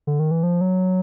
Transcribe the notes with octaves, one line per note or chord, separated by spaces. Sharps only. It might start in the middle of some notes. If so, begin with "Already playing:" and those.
D3
D#3
E3
F3
F#3